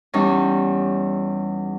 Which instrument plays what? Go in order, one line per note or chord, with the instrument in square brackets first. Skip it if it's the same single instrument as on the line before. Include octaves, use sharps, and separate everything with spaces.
[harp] E2 G3 C#4 D#4